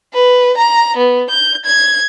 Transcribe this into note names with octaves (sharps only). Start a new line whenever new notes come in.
B4
A#5
B3
G6
G#6